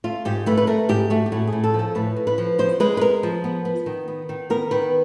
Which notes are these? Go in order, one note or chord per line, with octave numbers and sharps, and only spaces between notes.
A3 F4
G#2 G4
A3 B4
B4
A3 A#4
G#2 G4
A3 F#4
G4
A2 F#4
G#4
A2
A4
F3
A4
A2 B4
A2
B4
F3
B3 C5
G#3 B4
B4
B3 A#4
F3
B3
B3
D#3
B3
D#3
B3 A#4
D#3 B4